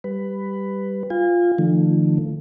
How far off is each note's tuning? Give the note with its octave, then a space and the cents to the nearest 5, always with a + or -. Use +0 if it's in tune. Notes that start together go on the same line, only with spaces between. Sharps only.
G3 +0 B4 +10
F4 +0 G#5 -40
D3 +40 F3 -35 A3 +5